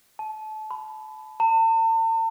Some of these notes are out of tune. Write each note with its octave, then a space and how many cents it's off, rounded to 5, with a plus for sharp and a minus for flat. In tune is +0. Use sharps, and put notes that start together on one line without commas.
A5 -30
B5 +20
A5 +45